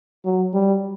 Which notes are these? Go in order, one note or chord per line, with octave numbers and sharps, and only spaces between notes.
F#3
G3